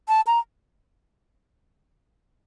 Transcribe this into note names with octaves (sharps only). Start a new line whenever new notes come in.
A5
A#5